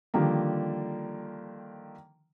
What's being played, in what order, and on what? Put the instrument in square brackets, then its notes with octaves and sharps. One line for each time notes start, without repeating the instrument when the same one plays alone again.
[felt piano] D3 D#3 F3 G3 A#3